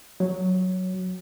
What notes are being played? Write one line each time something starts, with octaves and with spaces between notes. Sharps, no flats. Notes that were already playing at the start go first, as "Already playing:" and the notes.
F#3